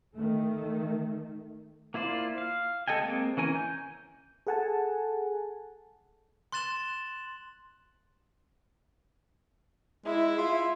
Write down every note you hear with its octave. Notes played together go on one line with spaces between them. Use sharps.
D#3 A3
A#3 E4 F4 C5 D5
F5
G#3 A4 D#5 G5 G#5
G#3 A#3 C4
E3 C#4 A#4 G#5
G6
G#4 A4 F#5 G#5 A5
C6 F#6 A6 E7 F#7 G7
G#3 E4
F4